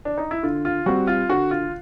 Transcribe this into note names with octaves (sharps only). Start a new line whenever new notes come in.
D4
D#4
E4
D3 F4
F4
G3 C4 F#4
F4
D3 F#4
F4